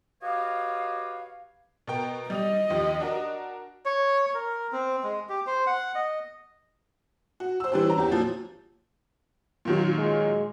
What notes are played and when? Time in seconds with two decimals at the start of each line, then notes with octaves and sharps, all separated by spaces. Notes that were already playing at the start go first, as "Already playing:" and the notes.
0.22 F#4 G4 B4 C#5 D#5 F5
1.88 B2 A#4 G5
2.30 G3 D#5 D#6 F7
2.70 D#2 F3
3.00 D4 F#4 A#4
3.85 C#5
4.35 A#4
4.72 C4
5.03 G#3
5.29 G4
5.47 C5
5.67 F#5
5.95 D#5
7.40 F#4
7.60 C5 E6
7.72 E3 G3 D4 G4 C5
7.86 C#4 A#5
7.98 E2 G4
8.11 A#2 F3 F#3
9.65 A#2 D#3 F#3
9.98 G#3